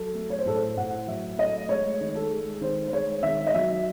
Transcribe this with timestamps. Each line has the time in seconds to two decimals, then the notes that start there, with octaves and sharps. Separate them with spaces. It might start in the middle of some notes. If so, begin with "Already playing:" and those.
Already playing: F#3 A4
0.15 A3
0.30 C#5
0.39 C5
0.46 A2 A4
0.55 C5
0.77 A2 F#5
1.07 F#3 E5
1.38 A3 D#5
1.69 G#3 C#5
2.01 D#3
2.15 A4
2.30 G#3
2.61 D#3 C5
2.88 C5
2.92 G#3 C#5
3.23 D#3 E5
3.47 D#5
3.55 F#3 E5